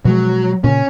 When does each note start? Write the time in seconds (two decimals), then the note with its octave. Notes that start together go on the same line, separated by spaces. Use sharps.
0.05 B2 F3 F#3 G#3
0.64 A#2 C#3 C#4